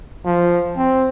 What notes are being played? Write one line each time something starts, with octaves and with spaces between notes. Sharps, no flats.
F3
C4